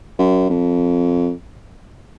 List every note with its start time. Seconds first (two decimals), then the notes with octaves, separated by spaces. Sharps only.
0.19 F#2
0.50 F2